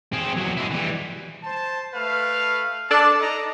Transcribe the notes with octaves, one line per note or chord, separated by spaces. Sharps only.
C4 G#4
E2 F#3
G#3 E4
E3 G3
C5 A5
A3 B4 F5
D4 A4 D5 A5
D#4 D#5 A#5